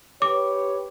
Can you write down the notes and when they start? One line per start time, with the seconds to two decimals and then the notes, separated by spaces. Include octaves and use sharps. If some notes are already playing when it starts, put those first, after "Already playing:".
0.22 G4 B4 C#5 D6